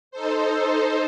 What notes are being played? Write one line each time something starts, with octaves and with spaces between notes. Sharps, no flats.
D#4 A4 C5